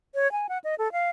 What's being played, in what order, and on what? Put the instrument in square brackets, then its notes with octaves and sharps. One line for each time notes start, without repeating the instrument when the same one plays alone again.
[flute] C#5
G#5
F#5
D#5
A4
F5